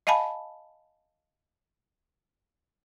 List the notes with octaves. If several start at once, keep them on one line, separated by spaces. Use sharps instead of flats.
D#5 F5 G#5 A5 B5